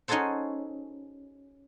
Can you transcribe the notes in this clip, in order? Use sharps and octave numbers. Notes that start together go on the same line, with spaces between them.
C#4 D#4 F#4 G#4 A4 C5